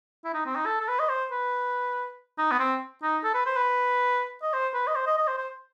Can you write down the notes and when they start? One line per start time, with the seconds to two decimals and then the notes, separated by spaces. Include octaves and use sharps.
0.24 E4
0.34 D#4
0.46 C4
0.55 D#4
0.66 A4
0.80 A4
0.88 B4
0.99 D#5
1.09 C5
1.32 B4
2.38 D#4
2.51 B3
2.59 C4
3.03 D#4
3.24 A4
3.34 B4
3.46 C5
3.57 B4
4.42 D#5
4.53 C5
4.74 B4
4.87 D#5
4.95 C5
5.07 D#5
5.17 D#5
5.27 C5
5.38 C5